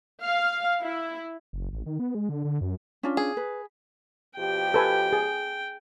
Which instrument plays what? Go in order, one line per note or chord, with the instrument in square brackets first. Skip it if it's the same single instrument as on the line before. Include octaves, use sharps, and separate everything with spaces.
[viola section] F5
E4
[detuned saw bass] F#1
A1
D#3
B3
G#3
D3
D3
F#2
[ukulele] C#4 D4 F4
[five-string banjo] G#4
[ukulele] B4
[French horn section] B2 F3 G4 [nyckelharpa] G5
[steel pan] A4 B4 G#5
G#4